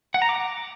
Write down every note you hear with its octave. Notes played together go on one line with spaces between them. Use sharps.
F#5
A#5
D6